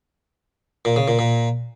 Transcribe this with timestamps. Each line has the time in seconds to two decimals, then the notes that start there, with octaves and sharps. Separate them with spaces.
0.85 A#2
0.96 C#3
1.08 A#2
1.19 A#2